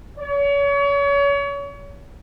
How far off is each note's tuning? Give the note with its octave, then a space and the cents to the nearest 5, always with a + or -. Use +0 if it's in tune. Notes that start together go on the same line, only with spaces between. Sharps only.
C#5 +35